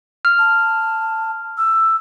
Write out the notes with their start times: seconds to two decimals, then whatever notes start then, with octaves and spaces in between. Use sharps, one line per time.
0.25 F6
0.39 A5
1.58 E6